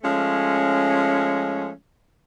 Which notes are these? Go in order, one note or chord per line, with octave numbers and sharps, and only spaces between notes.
F3 G#3 A3 C#4